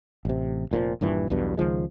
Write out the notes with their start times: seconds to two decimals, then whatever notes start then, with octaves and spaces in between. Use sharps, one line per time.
0.25 A1 C3
0.71 F1 A#2 C#3 F3
1.01 D#1 G2 A#2 E3
1.30 B1 E2 G2 B2
1.57 C#2 D#3 F3 G#3